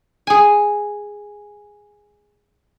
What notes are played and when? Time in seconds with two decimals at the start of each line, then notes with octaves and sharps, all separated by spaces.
0.27 G#4 G#5